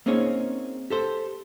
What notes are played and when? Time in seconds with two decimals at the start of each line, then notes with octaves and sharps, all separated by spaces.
0.06 A#3 C4 C#4 D#4 G#4 C#5
0.90 G4 A4 C5